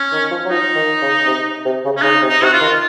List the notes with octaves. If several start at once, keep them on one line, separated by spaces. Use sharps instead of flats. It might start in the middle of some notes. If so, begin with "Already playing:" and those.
Already playing: C#4
D#3
F3
F#3
F3 D#4
D#3
C#3
C3
C3
C#3
C#4
C#3 D#4
C3
D#4
C3 F#4
F4
D#3